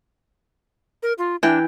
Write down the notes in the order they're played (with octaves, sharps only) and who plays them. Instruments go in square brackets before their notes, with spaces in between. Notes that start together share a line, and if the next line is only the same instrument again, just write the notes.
[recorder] A#4
F4
[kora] E3 G5 [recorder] D4